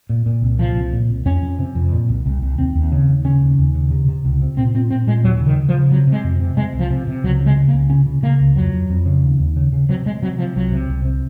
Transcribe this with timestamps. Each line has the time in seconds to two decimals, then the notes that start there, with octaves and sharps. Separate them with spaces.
0.09 A#2
0.26 A#2
0.42 C2
0.59 A#2 F3
0.76 C2
0.93 A#2
1.09 C2
1.26 F2 C#4
1.42 F2
1.59 C3
1.75 F2
1.92 A#2
2.09 C2
2.26 C2
2.42 C2
2.58 D#2 C4
2.75 D#2
2.92 C#3
3.09 D#2
3.24 C#3 C#4
3.42 D#2
3.58 D#2
3.75 C#3
3.91 C3
4.08 C3
4.25 C#2
4.42 C3
4.57 A#2 C4
4.74 A#2 C4
4.91 A#2 C4
5.07 A#2 G#3
5.24 D#2 F#3
5.41 C#3
5.47 D#3
5.57 C#3
5.69 F3
5.74 C#3
5.91 C3 F#3
6.07 C3
6.12 G#3
6.24 F2
6.40 C3
6.57 C3 G#3
6.73 C2
6.79 F3
6.90 C3
7.07 C3
7.24 C#2 F#3
7.41 C#3
7.46 G#3
7.56 C#3
7.68 A#3
7.74 C#2
7.90 C#3 C#4
8.06 C#3
8.22 C#3 A#3
8.40 C#2
8.56 F2 F#3
8.73 F2
8.90 F2
9.06 C#3
9.23 D#2
9.40 D#2
9.56 C#3
9.73 C#3
9.89 C3 F#3
10.06 C3 G#3
10.22 C3 F#3
10.39 C3 F3
10.56 C2 F#3
10.72 C3
10.89 C2
11.05 C3